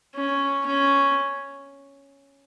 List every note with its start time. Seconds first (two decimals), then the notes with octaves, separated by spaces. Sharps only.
0.15 C#4
0.66 C#4